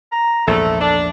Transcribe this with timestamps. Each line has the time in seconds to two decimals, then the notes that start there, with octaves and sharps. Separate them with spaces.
0.12 A#5
0.47 A#1 E2 G#2 A3 A4
0.80 D4